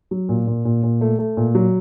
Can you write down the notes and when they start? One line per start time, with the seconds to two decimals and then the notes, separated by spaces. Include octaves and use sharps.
0.11 F#3
0.29 A#2
0.47 A#2
0.65 A#2
0.83 A#2
1.01 A3
1.19 A3
1.37 A#2
1.55 F#3